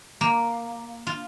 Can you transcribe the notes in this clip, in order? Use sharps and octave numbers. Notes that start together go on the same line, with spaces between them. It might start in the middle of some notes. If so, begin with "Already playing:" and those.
A#3
F4